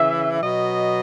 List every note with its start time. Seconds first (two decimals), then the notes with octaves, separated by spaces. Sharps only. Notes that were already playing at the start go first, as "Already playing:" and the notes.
Already playing: C#3 E3 E5
0.41 B2 F#3 D#5